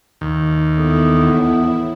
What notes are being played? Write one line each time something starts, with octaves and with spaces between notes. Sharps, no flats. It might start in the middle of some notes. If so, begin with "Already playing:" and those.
D#2
E2 A2 B3 E4